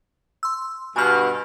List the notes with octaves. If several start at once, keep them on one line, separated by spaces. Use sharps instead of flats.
C6 E6
G2 B2 G#5 F6